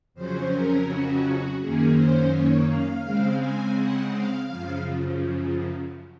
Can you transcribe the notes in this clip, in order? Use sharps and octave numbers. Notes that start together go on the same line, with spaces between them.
F2 C#3 F#3 C#4 C5
A#4
F#4
F#2 D#3 A#3 C#4 G#4
C5
C#5
F5
C#3 G#3 C4
G#5
F#5
F5
F#2 C#3 F3